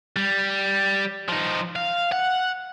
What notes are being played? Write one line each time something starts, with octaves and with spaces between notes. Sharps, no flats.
G3
F3 D#4
F5
F#5